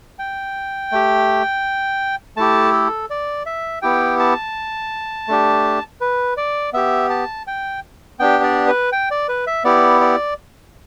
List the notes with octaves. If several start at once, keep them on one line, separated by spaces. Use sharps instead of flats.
G5
A3 G4
A3 E4 G4 A5
A4
D5
E5
B3 E4 G4 G5
A5
A3 D4 G4
B4
D5
B3 G4 E5
A5
G5
B3 D4 G4 G5
D5
B4
G5
D5
B4
E5
B3 E4 G4 D5
D5